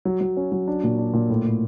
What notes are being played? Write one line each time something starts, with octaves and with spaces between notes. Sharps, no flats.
F#3
F#3
C#4
F#3
D4
A#2
D4
A#2
A2
A2